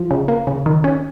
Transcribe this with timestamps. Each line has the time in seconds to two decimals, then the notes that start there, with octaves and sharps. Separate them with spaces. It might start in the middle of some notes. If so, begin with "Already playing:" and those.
Already playing: F3
0.11 C#3
0.28 A#3
0.47 C#3
0.66 D#3
0.84 C#4